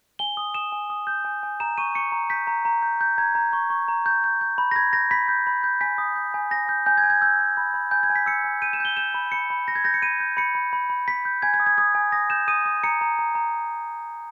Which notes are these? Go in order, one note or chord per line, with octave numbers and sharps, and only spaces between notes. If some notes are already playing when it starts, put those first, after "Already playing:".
G#5 G7
D#6
D#6 E7
G#5
D#6
G6
G#5
G#5
A#5 E7
C#6 D#7
C#6 C#7
A#5
G6 B6
A#5
A#5
G6
G6
A#5 G#6
A#5
C#6
C#6
A#5
G6
G6
G6
B5
A#6
B5 G#6
G6 A#6
B5 B6
G6
B5
G6
G#5 B6
D#6
G6
G#5
G#5 A#6
G6
G#5 G6
G#6
G#5
G#6
E6 G6
G#5
B5
B5
G#5 G6
G#6
G#5
B6
E6 C#7
G#5
G6 D#7
E7
G6 G7
G6 E7
B5
B5 C#7
B5
B5 A#6
G#6
G6 A#6
C#7
B5 D#7
G6
B5 C#7
B5
B5
B5
B5 B6
G6
G#5 G#6
G#6
D#6
G#6
D#6 G#6
G#5
D#6 A#6
G6 E7
D#6 D#7
D#6
A#5 C#7
A#5
A#5
A#5